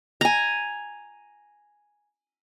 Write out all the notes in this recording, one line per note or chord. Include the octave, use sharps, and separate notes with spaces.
G#5 A#5